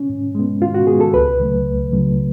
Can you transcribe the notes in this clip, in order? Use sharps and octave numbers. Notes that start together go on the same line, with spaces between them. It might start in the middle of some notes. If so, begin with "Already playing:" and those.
Already playing: C#4
G#2
G#3 B3
G#2 F4
F#4
G#3 B3 G#4
A4
C#2 B4
C#3 F#3 A3
C#2
C#3 F#3 A3